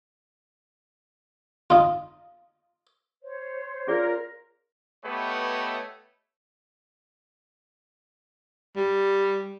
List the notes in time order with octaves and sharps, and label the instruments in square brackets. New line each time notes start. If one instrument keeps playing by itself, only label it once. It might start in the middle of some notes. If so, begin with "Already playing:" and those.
[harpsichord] D#4 F4
[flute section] C5 C#5
[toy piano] C#4 G#4 D5 [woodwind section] F4 A#4
[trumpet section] A3 B3 G4 B4 C#5 D#5
[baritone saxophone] G3